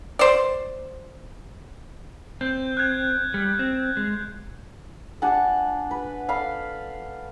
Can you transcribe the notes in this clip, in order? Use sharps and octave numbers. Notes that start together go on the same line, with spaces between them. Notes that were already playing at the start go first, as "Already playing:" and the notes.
C5 D5
C4 G6
F#6 G#6
G3
C4
G#3
D4 F#5 G#5 A5
B4
A4 F5 B5